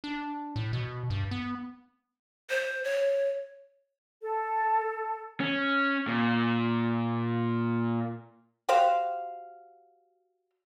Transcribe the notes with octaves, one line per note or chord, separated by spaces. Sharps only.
D4
A2
B2
G2
B3
C5
C#5
A4
C#4
A#2
F#4 G4 C5 F5